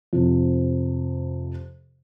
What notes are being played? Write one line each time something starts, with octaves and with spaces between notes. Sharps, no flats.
F2 C3